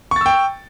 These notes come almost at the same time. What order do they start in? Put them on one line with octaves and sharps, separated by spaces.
C#6 A6 E6 G5